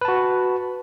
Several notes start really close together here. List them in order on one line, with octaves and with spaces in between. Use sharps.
B4 A5 F#4